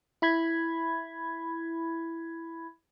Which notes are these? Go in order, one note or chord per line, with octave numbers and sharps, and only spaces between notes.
E4 B5 G#6